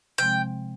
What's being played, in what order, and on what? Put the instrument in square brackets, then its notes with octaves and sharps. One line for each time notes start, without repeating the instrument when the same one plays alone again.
[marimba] C3 F3 G#3 C4 [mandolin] G5